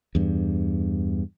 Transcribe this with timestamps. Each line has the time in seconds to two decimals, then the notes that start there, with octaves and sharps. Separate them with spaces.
0.15 E2 G2